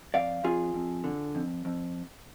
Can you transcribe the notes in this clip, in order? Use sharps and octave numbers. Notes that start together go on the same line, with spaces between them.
F2 D5 F5
F2 F4 G#4
F2
D3
F2
F2